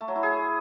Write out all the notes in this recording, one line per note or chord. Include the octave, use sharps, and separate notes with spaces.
A3
F#3
E4
G#4